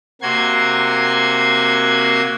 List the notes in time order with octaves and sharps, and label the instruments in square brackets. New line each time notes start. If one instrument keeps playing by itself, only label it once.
[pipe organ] C3 A#3 F#4 C6 G#6